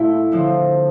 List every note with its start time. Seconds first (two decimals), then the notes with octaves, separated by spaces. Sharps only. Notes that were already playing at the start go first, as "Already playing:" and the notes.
Already playing: A#2 A3 E4
0.32 D3 F3 C4